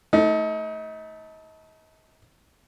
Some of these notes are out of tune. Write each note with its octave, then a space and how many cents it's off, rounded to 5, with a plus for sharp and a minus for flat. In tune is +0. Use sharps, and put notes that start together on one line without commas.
A3 +0 D#4 +35